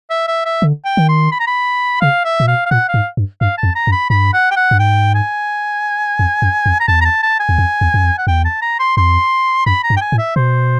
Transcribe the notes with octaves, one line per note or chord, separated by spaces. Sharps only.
E5
E5
E5
D3
G5
D#3
C6
B5
A#5
B5
C#3 F5
E5
A#2
B2 F5
F5
A#2 F#5
F5
G#2
G2
G2 F5
A5
F2
A#5
F#2
B5
G2 B5
F#5
G5
F#5
G2
G#2 G5
G#5
F2
F#2
F2
A#5
E2 A5
A#5
A5
A5
G#5
E2
F2
E2
F#2
F2
F#5
E2 G5
A5
A#5
C6
F2 C6
F#2 B5
A#5
G2
G5
G#5
A2
E5
B2 C5